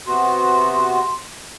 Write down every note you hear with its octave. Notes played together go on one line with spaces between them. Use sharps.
C3 B3 F#4 C6